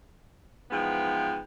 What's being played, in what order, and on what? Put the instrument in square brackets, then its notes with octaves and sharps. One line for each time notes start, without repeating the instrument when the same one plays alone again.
[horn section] G#2 E3 F3 B3 G5